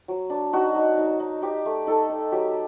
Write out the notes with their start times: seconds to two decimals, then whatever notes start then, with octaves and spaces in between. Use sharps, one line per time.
0.08 F#3
0.30 D4
0.53 D#4 F#4
0.75 D#4
0.97 D#4
1.20 D#4
1.42 D#4 G4
1.65 A3
1.87 D#4 A4
2.09 D#4
2.32 F#3 G4